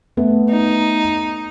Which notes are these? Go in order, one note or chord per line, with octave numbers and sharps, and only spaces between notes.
A3 B3
D#4